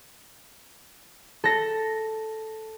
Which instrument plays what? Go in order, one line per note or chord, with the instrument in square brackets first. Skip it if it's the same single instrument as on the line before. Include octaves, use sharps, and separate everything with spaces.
[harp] A4 A#6